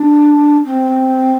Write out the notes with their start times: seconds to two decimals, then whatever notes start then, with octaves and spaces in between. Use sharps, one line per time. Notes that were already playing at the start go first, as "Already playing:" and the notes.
Already playing: D4
0.65 C4